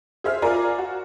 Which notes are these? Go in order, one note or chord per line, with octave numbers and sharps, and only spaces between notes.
G#4 C5 E5 F6
F4 A#4 D5 G#5 A#5
F#4